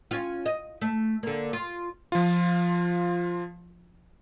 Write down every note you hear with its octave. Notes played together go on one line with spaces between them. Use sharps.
C#4 F4
D#5
A3
D3 A#3
F4
F3 F4